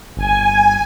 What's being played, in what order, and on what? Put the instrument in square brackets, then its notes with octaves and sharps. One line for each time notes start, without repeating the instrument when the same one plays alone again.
[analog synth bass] G1 [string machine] G#5